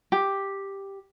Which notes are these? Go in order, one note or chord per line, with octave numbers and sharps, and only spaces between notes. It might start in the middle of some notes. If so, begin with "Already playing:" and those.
G4